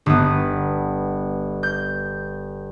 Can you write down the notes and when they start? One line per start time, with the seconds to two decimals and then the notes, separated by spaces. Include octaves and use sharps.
0.06 G1 B3
1.63 G6